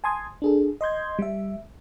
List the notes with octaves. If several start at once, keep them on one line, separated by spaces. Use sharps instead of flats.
G#5 A5 C6 D#6 G#6
D4 G#4 A4
D#5 C6 G6 G#6
G3 E5